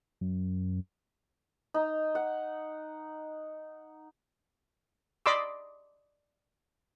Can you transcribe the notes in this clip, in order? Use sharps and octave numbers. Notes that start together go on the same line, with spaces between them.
F#2
D#4
F#5
D5 D#5 B5 C6 D6 E6